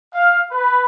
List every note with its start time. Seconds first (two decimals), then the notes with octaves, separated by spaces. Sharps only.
0.13 F5
0.51 B4